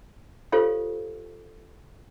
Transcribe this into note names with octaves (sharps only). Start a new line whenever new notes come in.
F4 G4 A4 C5 C#5 F5